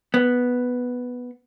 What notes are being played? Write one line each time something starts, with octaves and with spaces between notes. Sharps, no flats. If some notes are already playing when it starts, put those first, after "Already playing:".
B3